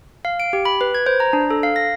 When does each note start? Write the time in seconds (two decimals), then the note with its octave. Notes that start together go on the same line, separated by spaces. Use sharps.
0.25 F5
0.40 D7
0.53 G4
0.65 B5
0.81 B4
0.95 G#6
1.06 C5
1.20 A#5
1.33 D4
1.50 A4
1.63 F5
1.76 A#6